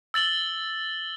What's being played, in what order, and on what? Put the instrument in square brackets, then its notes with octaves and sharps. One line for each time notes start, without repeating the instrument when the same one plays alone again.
[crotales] E6 A6 F#7 G7